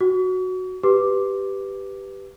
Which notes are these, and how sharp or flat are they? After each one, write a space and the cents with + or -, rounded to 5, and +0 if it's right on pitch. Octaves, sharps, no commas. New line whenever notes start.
F#4 +0 C#6 +45
G4 +0 B4 +0 D6 +0